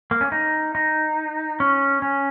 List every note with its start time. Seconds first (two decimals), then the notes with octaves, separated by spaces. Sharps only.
0.11 A#3
0.21 C#4
0.32 D#4
0.75 D#4
1.60 C#4
2.02 C#4